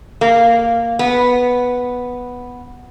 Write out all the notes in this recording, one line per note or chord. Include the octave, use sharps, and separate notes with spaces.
A#3
B3